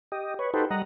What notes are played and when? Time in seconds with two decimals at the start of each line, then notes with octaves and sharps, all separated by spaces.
0.12 G4 D#5
0.39 B4 C#5
0.54 D#4 F#4 G4 A4 B4 C5
0.71 G3 D#5 F#5 A#5